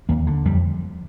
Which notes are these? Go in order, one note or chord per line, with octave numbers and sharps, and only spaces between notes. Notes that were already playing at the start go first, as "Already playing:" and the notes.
D#2 A#3
D3
F2 G3